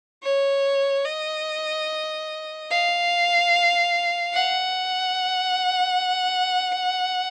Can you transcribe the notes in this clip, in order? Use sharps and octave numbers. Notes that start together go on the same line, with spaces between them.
C#5
D#5
F5
F#5